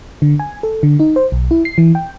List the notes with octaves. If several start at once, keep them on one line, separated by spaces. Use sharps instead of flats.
D3
G#5
A4
D3
D#4
C5
B1
E4
C7
E3
G5